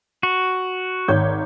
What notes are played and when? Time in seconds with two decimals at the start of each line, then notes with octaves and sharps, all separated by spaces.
0.23 F#4
1.08 G#1 C#5 G6